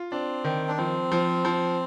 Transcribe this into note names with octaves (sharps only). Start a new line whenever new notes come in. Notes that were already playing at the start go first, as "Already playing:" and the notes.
Already playing: F4
C4 D4
D#3
D4
F3 C4
F3
F3